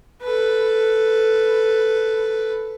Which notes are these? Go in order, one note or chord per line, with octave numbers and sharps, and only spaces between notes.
A4 B4